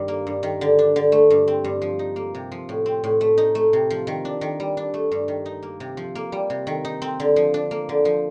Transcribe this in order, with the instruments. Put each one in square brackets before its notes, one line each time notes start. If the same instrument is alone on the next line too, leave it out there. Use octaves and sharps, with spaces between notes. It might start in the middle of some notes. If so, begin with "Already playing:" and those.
Already playing: [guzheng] G2 D#3
A#3
G2
D#3
D3
D4
D3
A3
G2
C4
G2
F3
D#4
A#3
C3
F3
A2
C4
A2
A3
D#4
A3
C3
F3
D#3
D4
D#3
G3
D4
A3
G2
D#3
D#4
A#3
C3
F3
A#3
G3
C3
D#3
D#4
C4
D3
F3
D4
A#3
D3
F3